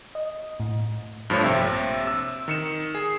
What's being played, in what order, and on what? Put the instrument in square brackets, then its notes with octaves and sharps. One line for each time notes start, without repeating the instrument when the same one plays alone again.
[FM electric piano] D#5
A2
[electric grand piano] G2 F3 A3 C#5
A#1 C3 C4 E5
E6
D#3 C#7 E7
G#4 C7